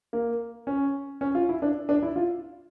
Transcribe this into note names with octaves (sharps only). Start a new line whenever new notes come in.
A#3
C#4
C#4
F4
E4
D4
D4
E4
F4